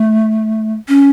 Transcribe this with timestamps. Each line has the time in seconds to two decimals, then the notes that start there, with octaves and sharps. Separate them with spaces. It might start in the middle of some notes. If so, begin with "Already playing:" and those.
Already playing: A3
0.88 C#4